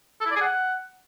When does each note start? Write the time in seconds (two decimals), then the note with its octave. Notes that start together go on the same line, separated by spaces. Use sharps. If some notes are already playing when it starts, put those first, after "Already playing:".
0.21 A4
0.26 E4
0.31 D5
0.36 G#4
0.41 F#5